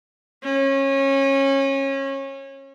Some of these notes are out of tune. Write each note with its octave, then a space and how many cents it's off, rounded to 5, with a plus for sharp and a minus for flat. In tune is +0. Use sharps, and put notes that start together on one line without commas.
C#4 -25